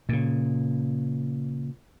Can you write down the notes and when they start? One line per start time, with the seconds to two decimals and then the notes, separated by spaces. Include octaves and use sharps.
0.09 A#2 C#3